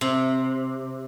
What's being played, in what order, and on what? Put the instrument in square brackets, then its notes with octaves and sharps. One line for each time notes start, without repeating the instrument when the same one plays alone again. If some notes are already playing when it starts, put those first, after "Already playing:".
[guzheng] C3